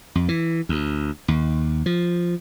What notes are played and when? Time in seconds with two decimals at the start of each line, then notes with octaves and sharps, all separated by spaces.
0.15 F2
0.29 E3
0.69 D2
1.28 D#2
1.86 F3